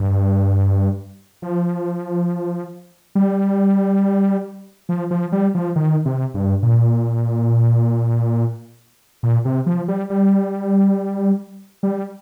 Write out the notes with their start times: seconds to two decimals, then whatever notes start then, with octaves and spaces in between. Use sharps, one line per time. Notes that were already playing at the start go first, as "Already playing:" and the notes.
Already playing: G2
1.42 F3
3.15 G3
4.89 F3
5.11 F3
5.32 G3
5.55 F3
5.76 D#3
6.05 C3
6.34 G2
6.63 A#2
9.23 A#2
9.45 C3
9.66 F3
9.88 G3
10.10 G3
11.83 G3